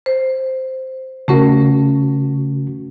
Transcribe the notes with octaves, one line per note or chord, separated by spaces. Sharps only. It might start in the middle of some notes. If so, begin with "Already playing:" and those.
C5
C#3 A3 C#4 F#4 A#4